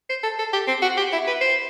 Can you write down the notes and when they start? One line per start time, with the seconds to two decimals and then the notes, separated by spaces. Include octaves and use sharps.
0.09 C5
0.23 A4
0.39 A4
0.53 G4
0.68 C4
0.82 F#4
0.97 G4
1.12 E4
1.27 B4
1.41 C5